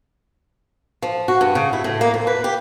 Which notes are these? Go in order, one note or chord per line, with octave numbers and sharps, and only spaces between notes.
F3
F#4
G2
C#3
E4
A2
A#3
F2
B4
G4